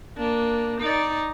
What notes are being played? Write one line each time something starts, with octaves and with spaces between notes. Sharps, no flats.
A#3 D4
D#4 D5